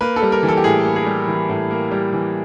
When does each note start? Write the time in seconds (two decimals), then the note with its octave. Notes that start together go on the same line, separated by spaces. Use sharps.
0.01 A#3 B4
0.16 A4
0.22 G3
0.32 A#4
0.43 E3
0.48 A4
0.57 G4
0.64 A2 G#4
0.85 A#3
0.96 G#4
1.06 G3
1.28 E3
1.49 A2
1.71 A#3
1.91 G3
2.13 E3